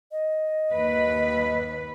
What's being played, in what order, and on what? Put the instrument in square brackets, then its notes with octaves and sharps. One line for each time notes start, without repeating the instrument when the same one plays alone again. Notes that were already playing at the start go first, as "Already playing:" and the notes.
[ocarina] D#5
[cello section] D#2 B4